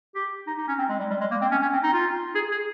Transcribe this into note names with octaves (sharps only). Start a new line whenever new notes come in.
G4
D#4
D#4
C#4
C4
G#3
G3
G3
G#3
A#3
C4
C#4
C#4
C4
D#4
F4
G#4
G#4